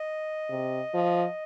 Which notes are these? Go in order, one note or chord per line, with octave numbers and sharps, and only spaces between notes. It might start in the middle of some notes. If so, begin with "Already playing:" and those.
Already playing: D#5
C3
F3